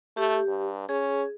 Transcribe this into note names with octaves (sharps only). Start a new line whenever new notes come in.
A3 G4
G2
C#4 G#4